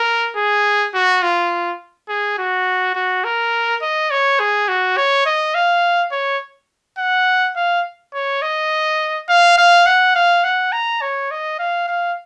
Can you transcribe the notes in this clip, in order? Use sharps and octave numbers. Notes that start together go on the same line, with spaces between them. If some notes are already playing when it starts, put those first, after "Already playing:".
Already playing: A#4
G#4
F#4
F4
G#4
F#4
F#4
A#4
D#5
C#5
G#4
F#4
C#5
D#5
F5
C#5
F#5
F5
C#5
D#5
F5
F5
F#5
F5
F#5
A#5
C#5
D#5
F5
F5